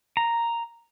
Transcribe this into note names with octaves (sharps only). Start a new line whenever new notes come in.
A#5